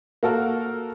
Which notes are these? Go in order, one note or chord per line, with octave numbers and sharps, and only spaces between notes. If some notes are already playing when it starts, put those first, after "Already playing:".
A#3 F#4 A4 A#4